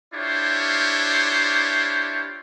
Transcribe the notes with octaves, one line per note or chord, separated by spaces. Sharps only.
D4 E4 F4 G4 C5 C#5